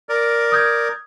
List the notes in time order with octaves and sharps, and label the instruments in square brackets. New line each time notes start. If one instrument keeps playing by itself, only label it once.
[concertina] A#4 D5
[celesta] D#6 G6 G#6